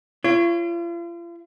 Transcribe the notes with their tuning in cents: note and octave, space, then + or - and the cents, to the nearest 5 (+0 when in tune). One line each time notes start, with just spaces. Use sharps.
F4 -40 C#5 +0